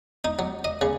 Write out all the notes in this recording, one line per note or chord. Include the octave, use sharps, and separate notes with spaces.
D#4
F#3
D#5
C#3